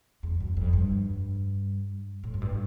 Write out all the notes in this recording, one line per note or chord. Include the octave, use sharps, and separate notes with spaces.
E2
F#2
F2
G2
A2
F#2
G2